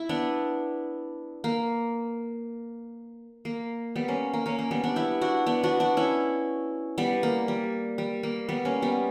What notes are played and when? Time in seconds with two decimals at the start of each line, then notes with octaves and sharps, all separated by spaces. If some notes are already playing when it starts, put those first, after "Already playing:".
Already playing: E4
0.09 B3 D4
1.44 A#3
3.45 A#3
3.96 G3 B3
4.08 A#3 C#4
4.33 A#3
4.46 A#3 C#4
4.59 A#3
4.71 G3 B3
4.84 B3 D4
4.96 E4 G4
5.21 D4 F#4
5.46 B3 D4
5.63 D4 F#4
5.80 D4 F#4
5.97 C#4 E4
6.98 G3 B3
7.23 A#3
7.48 G3
7.98 G3
8.23 A#3
8.49 G3 B3
8.65 A#3 C#4
8.82 G3 B3